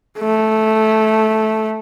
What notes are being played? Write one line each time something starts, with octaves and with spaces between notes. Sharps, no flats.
A3